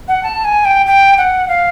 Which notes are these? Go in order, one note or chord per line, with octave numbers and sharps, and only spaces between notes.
F#5
A5
G#5
G5
G5
F#5
F5